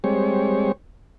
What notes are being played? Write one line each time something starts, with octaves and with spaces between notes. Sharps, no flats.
G3 G#3 C4 C#5